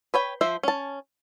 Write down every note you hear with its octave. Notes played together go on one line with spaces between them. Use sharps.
B4 C#5 G5
F3 C5 E5
C#4 A5